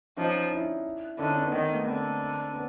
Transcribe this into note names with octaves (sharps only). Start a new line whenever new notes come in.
F3 C#4 D#4
D4 E4
D3 C#4 D#4
C4 D4
B3 C#4
D#3 A#3 C4
A3 B3
D3 A#3 C4
B3 C#4